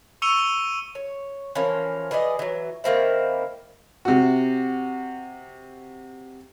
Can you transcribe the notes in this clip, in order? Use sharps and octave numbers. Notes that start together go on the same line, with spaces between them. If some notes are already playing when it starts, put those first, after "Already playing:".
C#6 E6 C#7 D#7 F7 G7
C#5
E3 F3 A#3 C#4
E3 G#4 D5 D#5
E3 F#3
D#3 A#3 C4 E4
C3 F#4